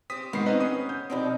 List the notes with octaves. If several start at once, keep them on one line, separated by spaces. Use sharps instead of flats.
C4 G4 D#6 B6
G#2 D#3 B3 C7
C4 C#4 D#4 B4 D#5
C#4 D#6
G6
B2 F3 C4 D#4 D5